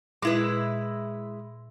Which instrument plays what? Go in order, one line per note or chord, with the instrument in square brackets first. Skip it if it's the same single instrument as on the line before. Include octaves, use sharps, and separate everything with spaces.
[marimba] A#2 [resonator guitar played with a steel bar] G#3 E4 B4